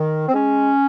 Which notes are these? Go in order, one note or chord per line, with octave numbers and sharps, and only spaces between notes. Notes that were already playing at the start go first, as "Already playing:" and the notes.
Already playing: D#3
C4
G#3 C#4